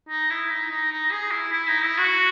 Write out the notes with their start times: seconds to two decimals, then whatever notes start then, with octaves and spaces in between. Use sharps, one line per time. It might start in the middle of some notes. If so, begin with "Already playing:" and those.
0.09 D#4
0.30 E4
0.50 D#4
0.70 D#4
0.92 D#4
1.12 G#4
1.31 E4
1.52 E4
1.68 D#4
1.83 E4
1.98 F#4